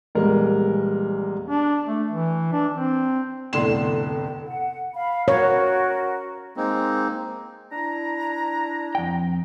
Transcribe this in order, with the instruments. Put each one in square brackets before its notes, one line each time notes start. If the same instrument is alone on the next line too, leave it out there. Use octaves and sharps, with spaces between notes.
[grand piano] A#1 E2 G3 G#3 A#4
[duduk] D4
A3
E3
D4
C4
[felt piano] F1 E2 A2 D3 C6 E7
[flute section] F#5
F5 B5
[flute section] F#4 A#4 [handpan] C#5
[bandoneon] G#3 A#3 C4 D#4
[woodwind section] D4 E4 A#5
[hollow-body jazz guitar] F2 G5